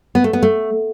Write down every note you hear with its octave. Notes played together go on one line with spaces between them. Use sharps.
B3
A3
B3
A3